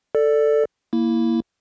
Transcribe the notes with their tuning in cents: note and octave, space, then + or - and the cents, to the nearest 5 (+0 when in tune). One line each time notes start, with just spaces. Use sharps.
A4 +10 D5 +0
A#3 +0 E4 +0